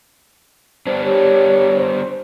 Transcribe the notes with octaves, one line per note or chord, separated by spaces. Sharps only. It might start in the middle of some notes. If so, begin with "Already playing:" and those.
G3 B3 D4 C5
G4 C#5
C5